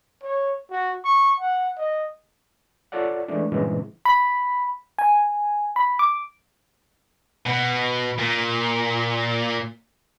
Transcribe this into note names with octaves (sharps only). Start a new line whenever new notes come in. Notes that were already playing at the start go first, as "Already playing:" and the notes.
C#5
F#4
C#6
F#5
D#5
F4 A4 C#5 D5 F#5
E3 G#3 A3 D4
G2 A#2 C#3 E3 G#3 C4
B5
G#5
B5
D6
B2
A#2